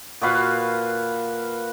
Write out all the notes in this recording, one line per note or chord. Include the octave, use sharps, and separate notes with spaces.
A#2 F#4 B4 F5